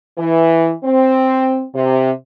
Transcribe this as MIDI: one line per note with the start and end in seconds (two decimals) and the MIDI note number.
0.18 0.72 52
0.84 1.64 60
1.74 2.10 48